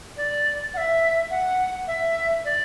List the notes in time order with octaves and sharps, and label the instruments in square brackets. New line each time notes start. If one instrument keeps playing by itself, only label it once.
[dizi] D5
F#5
E5
F#5
E5
D5